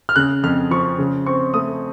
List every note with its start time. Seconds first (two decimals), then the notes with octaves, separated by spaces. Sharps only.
0.09 F6
0.16 C#3 F#6
0.43 F2 F6
0.71 F3 C#6
0.98 C#3
1.26 C4 C#6
1.54 A3 D#6